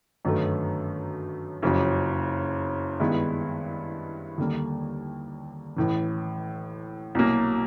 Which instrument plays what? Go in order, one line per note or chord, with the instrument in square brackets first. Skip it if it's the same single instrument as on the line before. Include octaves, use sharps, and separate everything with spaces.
[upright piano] G1 F#2 D#3 F#3 A3
F#1 F2 C#3 F#3
G2 D#3 G#3 B3 E4
D#2 D3 G3 A#3
A1 A2 E3
C2 B2 F#3 A#3